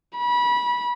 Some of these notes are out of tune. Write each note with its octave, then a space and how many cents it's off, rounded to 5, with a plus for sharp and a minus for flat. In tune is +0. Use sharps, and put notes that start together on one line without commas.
B5 -25